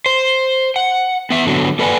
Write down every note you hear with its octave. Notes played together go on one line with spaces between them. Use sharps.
C5
F#5
B3 E5
D3 F#3 B3
A#3 A4 B4 D5 F#5 G#5